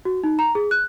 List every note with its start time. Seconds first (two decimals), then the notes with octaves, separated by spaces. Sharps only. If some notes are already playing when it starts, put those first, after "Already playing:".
0.05 F#4
0.24 D#4
0.39 A#5
0.55 G#4
0.71 F#6